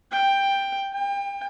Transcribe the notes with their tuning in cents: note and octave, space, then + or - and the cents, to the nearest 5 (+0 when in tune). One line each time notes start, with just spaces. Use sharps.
G5 +10
G5 +30